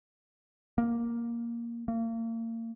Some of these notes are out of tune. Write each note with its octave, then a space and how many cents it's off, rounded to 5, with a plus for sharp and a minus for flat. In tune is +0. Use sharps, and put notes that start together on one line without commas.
A#3 +5
A#3 -35